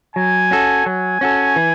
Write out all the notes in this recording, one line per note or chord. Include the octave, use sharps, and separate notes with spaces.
F#3 G#5
C#4 F#4 A4
F#3 G#5
C#4 F#4 A4
E3